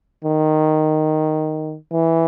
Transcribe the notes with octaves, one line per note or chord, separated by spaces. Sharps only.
D#3
E3